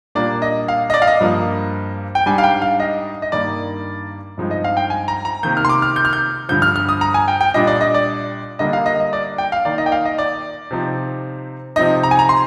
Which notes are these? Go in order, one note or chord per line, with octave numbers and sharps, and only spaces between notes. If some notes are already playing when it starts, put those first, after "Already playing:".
A#2 G3 A#3 D4 D5
D#5
F5
D#5
D5
F5
D#5
G2 F3 A#3
G5
G#2 G3 D4 G#5
F5
G5
F5
D#5
D#5
G2 D#3 A#3 D5
G2 F3 G#3 C4 D#4
D#5
F5
G5
G#5
A#5
A#5
C3 D#3 A#3 G6
F6
C6
D6
F6
G6
F6
G6
G2 D3 F3 G6
F6
F6
D#6
A#5
G#5
G5
G5
A#2 G3 D4 D#5
D5
D#5
D5
D3 G3 A#3 D4 D#5
F5
D#5
D#5
D5
G5
F5
D#3 A#3 D#4 D5
D#5
G5
F5
D#5
D5
C3 F3 C4 D#4
C3 F3 C4 D#4 D#5
A#5
G#5
A#5
C6